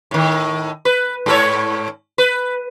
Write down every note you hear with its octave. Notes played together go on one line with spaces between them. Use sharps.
A2 D#3
B4
G#2 A4 C#5
B4